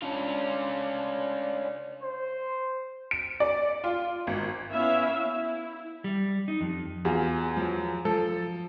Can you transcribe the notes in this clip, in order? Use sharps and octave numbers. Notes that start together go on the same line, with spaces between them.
C#4 D4 F4
C5
D7
D5
F4
G#1
B3 C#4 E4 E5 F5
E4
G3
D#4
F2
E2 F4 F#4 G#4
F3 F#3
F3 A4